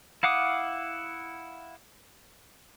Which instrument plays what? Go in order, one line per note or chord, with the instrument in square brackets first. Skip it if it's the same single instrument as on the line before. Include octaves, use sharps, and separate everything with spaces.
[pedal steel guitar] E4 F5 F#5 D6 D#6